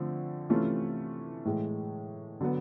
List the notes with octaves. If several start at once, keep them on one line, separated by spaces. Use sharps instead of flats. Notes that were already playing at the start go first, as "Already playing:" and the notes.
Already playing: D3 F3 A3 C4
C3 E3 A3 C#4 F4
A2 E3 G#3
D3 F#3 B3